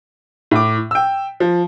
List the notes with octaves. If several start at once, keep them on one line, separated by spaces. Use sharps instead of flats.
A2 D6
G5 E6
F3